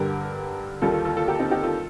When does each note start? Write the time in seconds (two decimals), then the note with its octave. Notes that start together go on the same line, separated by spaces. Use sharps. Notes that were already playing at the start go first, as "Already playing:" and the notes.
Already playing: G2 D3 G3 G4 A#4
0.82 D#2 D#3 G3 F4 A4
0.93 F4 A4
1.05 F4 A4
1.17 F4 A4
1.28 G4 A#4
1.39 C4 D#4
1.51 D#4 G4
1.63 F4 A4